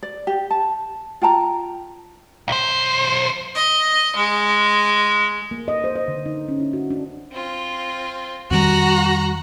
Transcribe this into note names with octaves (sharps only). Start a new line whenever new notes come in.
D5
G4
A5
F4 G5 A5 A#5
B1 C5
D#5
G#3
A#3
D#5
C5
D#5
D3
D#4
C#4
E4
F#4
D4
C4 F4
F2 D#3 G3 F#4 A#5 F#6